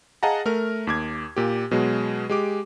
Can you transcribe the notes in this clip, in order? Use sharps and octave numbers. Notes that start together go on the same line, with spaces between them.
G#4 D#5 F5 F#5 A5 A#5
A3 A#4 F6
D#2 D6 G#6
A#2 G4
B2 F#3 G#3
G#3 G4 D6